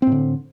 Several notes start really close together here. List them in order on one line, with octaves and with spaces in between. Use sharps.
C4 A2 D3